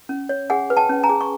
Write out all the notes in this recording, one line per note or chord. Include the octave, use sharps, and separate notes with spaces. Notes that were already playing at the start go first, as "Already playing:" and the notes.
C#4
C#5
G#4 F#5 G#5
B4
G5 A5
C#4
G#5 A#5
G#4
C#6